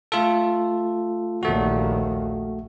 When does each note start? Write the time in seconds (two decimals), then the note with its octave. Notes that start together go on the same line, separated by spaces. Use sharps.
0.12 A3 F4 A4
1.43 A#1 D#2 A3 F#4